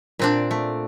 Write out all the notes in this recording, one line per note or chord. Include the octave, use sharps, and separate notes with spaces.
A#2 C4 D4
A3